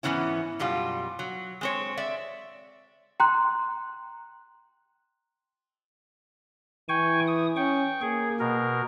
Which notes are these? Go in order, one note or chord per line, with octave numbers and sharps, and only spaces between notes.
G#2 B2 E3 B3 C#4 E4
F#2 B2 G3 F4
F#3
G#3 C4 C#5
D5 E5
G5 A#5 C6 F#6
E3 G5 G#5 C#6
D#6
C#4 G5 C#6
A#3 G#4
B2 A#4